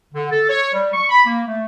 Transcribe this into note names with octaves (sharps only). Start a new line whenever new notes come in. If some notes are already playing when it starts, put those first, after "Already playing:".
D3
A4
C#5
G3
C#6
B5
A#3
A3